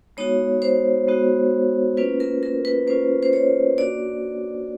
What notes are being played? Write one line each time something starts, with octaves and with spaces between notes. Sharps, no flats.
G#3 B3 D#4 F#4 C#5
C5
G#3 B3 D#4 F#4
A#3 C#4 F4 B4
A#4
A#4
B4
A#3 C#4 F4 C5
C5
C#5
A#3 D4 F#4 D5